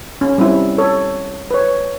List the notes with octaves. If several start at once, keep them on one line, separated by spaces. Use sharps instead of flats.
C#4
G3 C4 C#4 E4
A4 C#5
B4 C#5